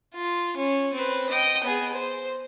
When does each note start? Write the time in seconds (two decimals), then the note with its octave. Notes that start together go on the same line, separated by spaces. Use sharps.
0.15 F4
0.57 C#4
0.94 C4 B4
1.29 D#5 G5
1.64 B3 G#4
1.93 C5